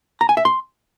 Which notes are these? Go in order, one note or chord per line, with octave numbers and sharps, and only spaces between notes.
A#5
G#5
E5
C6